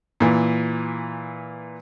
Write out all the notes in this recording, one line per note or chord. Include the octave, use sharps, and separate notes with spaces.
A#2 E3